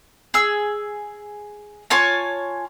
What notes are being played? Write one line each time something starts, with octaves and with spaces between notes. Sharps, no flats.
G#4 E6
F4 C#5 G#5 A5